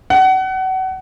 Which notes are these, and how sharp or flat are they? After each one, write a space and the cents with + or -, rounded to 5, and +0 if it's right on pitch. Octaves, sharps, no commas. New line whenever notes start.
F#5 +30